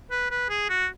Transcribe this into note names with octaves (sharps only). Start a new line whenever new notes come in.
B4
B4
G#4
F#4